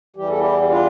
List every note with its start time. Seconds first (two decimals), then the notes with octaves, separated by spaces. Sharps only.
0.16 E2 E3 G3 G4
0.28 A4
0.39 E4 G4
0.62 E4
0.68 D4 F4